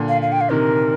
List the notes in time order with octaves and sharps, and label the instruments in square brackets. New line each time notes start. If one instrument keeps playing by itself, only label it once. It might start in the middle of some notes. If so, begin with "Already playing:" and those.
Already playing: [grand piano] A#2 D3
[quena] F5
F5
G5
F5
[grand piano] C3 D#3 [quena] A#4